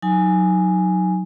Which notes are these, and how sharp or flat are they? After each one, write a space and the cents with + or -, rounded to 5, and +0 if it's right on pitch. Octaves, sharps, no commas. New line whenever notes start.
F#3 -5 D#4 +5 G#5 +0